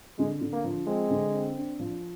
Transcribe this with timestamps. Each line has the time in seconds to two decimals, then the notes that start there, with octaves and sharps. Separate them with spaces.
0.18 D3 G#3
0.41 D3
0.53 A#3
0.64 F3
0.87 G#3 C4
1.10 D3
1.34 C4
1.57 D4
1.79 F3